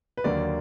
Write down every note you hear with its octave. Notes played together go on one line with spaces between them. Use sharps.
B4
D#2 D3 F#3 A#3 D5